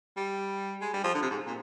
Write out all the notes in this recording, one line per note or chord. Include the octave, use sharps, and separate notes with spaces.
G3
G#3
G3
F3
D3
C3
G#2
A#2